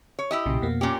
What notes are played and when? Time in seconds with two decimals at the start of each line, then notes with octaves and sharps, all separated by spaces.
0.19 C#5
0.31 E4 G4 D#5
0.46 B1 A#2 C#3
0.61 F2 B2 A#3
0.81 A#2 C#4 G4